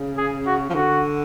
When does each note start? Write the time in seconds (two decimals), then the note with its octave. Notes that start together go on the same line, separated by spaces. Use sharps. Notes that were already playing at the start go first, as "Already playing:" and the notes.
Already playing: C#3
0.17 G#4
0.46 F#4
0.70 F3
0.74 D3 F#4